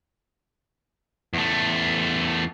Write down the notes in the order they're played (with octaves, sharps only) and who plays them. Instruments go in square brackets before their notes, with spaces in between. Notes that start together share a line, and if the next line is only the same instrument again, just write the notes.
[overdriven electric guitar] E2 A3